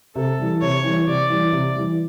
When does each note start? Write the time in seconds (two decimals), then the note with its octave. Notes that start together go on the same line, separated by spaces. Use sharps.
0.16 C3 A4
0.39 E3 G3
0.61 C3 C#5
0.84 E3 G3
1.07 C3 D5
1.30 E3 G3
1.52 C3
1.76 E3 G3